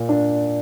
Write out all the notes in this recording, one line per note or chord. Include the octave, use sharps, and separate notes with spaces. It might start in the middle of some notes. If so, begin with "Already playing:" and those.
Already playing: A#2
D4